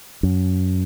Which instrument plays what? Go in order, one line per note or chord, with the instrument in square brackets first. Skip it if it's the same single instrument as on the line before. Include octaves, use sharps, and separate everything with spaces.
[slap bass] F#2